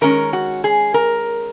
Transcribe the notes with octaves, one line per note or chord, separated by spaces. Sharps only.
D#3 G#3 C#4 A#4
F#4
G#4
A#4